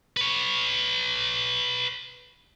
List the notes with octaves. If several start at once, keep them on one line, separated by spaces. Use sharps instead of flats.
B4 C#5